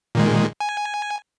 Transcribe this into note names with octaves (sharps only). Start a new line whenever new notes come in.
A#2 D#3 G#3
G#5